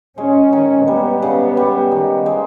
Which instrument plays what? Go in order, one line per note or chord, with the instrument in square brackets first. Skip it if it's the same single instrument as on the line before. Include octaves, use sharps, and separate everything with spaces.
[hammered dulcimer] G#3 [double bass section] C#4
[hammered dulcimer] D#3
[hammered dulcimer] G3 [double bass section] B3
[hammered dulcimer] C#3
G3
D#3
G#3